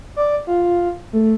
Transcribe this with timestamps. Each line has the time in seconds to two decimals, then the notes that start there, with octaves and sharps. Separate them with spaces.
0.16 D5
0.47 F4
1.13 A3